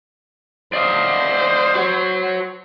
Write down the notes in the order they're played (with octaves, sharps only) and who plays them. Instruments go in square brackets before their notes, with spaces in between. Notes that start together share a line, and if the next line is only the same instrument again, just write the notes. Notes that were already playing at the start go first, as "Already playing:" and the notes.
[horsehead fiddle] C5 [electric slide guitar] D5 D#5 F5
[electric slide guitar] F#4 C#5